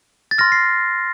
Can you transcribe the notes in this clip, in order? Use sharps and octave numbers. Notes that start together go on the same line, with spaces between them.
A6
C6 F6 A#6
C7